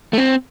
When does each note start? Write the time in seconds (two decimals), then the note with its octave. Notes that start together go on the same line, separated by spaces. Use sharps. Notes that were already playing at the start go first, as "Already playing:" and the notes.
0.13 A3
0.18 C4